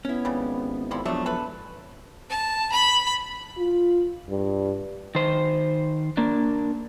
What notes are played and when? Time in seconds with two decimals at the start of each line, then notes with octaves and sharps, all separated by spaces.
0.05 B3 C#4 E4
0.25 G#1 C#3 G3
0.91 F3 G3 E4
1.05 E1 F3 F#3 A3 D4
1.26 A4 B4
2.30 A5
2.72 B5
3.58 F4
4.29 G2
5.15 D#3 C5
6.17 A#3 D4